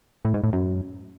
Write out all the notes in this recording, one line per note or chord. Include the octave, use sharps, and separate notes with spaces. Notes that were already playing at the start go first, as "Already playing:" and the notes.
A2
G#2
A2
F#2